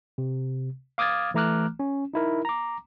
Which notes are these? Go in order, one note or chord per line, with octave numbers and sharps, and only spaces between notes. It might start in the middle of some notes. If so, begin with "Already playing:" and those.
C3
F5 D6 D#6 F6 G#6 A6
E3 A3 A#5 D6 F6 F#6
C#4
D#4 E4 A#4
A#5 D6